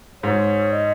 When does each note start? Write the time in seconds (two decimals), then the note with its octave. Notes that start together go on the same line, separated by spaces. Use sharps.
0.23 G#2 C#5
0.72 D#5